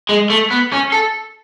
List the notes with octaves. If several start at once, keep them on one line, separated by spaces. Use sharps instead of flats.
G#3
A3
B3
C#4
A4